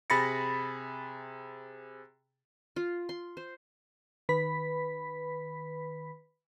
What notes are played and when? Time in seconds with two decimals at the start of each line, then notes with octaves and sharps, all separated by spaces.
0.10 C3 G#4 B5 A6 A#6 C#7
2.76 F4
3.09 C6
3.37 C5
4.29 D#3 B4 B5 B6